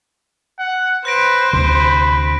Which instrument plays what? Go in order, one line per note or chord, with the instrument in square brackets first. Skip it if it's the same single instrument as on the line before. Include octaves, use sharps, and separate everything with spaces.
[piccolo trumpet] F#5
[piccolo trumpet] B4 [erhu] C5 [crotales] F#6 A#6 D7
[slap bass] D2 C3 [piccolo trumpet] B5